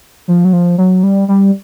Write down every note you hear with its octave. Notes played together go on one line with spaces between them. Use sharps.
F3
F#3
F3
F#3
G3
G3